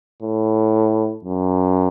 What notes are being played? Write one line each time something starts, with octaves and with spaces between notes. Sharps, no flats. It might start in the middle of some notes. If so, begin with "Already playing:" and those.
A2
F#2